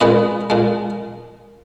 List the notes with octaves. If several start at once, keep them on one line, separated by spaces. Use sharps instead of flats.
A#2 G#3 B4 D#5
A#2 G#3